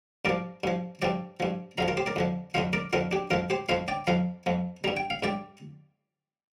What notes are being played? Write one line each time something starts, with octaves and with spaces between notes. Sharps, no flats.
G2 F3 A#4 D5
G2 F3
G2 F3 D5 G5
G2 F3
F2 D3 F3 F5 A#5
F4 A#4
G4 C5
A#4 D5
F2 D3 F3
F2 D3 F3 C5 F5
A#4 D5
F2 D3 F3 F4 A#4
D4 G4
F2 F3 F4 A#4
G4 C5
F2 F3 C5 F5
D5 G5
F2 F3 F5 A#5
F2 F3
G2 G3 A#5
G5
F5
G2 G3 D5 G5